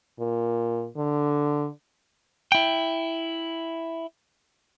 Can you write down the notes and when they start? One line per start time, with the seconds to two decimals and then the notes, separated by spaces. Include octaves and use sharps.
0.20 A#2
0.97 D3
2.52 E4 G5